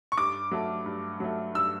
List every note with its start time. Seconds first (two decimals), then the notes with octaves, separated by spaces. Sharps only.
0.12 C#6
0.17 G2 D6
0.51 F#3 A3
0.86 G2
1.20 F#3 A3
1.54 G2 E6